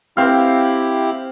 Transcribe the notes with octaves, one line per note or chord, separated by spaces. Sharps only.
C4 E4 G4 F5